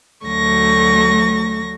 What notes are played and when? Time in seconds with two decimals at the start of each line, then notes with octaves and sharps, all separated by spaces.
0.25 D2 F#3 A3 C#6 A#6